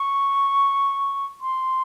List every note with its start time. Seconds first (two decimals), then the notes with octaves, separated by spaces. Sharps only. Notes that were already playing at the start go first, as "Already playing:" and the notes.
Already playing: C#6
1.41 C6